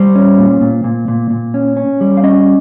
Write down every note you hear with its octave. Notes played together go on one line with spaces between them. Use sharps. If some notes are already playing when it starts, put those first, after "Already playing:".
Already playing: G3 C5
C#4
A#2
A#2
A#2
A#2
A#2
C#4
C#4
G3
F5
C#4 D#5